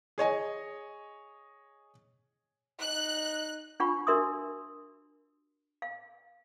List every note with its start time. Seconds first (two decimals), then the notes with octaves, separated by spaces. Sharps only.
0.18 G#4 C#5 D#5 G#5
2.81 D#4 F#6
3.80 D4 F4 F#5 B5 C#6
4.07 D4 F#4 A#4 E5 C6 D#6
5.82 F5